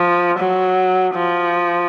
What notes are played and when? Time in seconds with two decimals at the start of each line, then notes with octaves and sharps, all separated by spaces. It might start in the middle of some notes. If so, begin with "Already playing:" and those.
Already playing: F3
0.39 F#3
1.14 F3